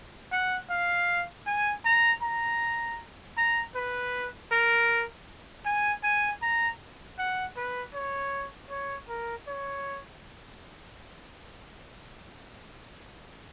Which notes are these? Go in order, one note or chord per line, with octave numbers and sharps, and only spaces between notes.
F#5
F5
G#5
A#5
A#5
A#5
B4
A#4
G#5
G#5
A#5
F#5
B4
C#5
C#5
A#4
C#5